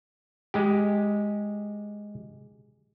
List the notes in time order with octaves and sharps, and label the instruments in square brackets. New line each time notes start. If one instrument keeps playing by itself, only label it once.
[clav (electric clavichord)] G#3 G4